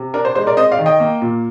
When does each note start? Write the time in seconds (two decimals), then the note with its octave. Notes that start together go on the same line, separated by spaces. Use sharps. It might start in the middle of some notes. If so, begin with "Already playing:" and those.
Already playing: C3
0.14 D4 A#4
0.25 C5
0.35 G#3 C5
0.47 A#4 D5
0.57 C4 C5 D#5
0.71 D5 F5
0.79 D#3
0.86 D#5 G5
1.00 A#3
1.22 A#2